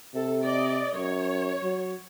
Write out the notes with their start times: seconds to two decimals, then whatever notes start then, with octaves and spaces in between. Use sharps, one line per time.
0.15 C3 A4
0.44 D5 D#5
0.95 F#2 C#5
1.63 F#3